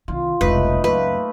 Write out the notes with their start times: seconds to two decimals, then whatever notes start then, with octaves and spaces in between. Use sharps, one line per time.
0.08 C2 D#3 F4
0.41 E1 C2 A3 D#4 B4 D#5
0.84 C#2 F#2 A3 A#3 B4